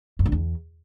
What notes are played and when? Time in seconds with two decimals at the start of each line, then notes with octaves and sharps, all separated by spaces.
0.19 F#2
0.26 D3
0.32 E2